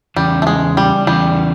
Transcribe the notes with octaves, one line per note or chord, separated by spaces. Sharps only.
E2 C#3 E3 G3
A3
G#3
G3
E2 C#3 E3 G3